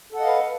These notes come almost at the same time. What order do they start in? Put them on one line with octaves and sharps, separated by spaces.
A4 F#5 D#5 F5 B4